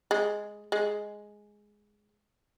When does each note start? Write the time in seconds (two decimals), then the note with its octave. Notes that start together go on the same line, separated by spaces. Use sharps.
0.11 G#3
0.72 G#3